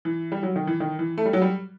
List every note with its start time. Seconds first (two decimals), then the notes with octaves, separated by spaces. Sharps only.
0.05 E3
0.32 G3
0.43 F#3
0.56 D#3
0.67 E3
0.80 D#3
0.99 E3
1.18 A3
1.25 G3
1.33 F#3
1.42 G3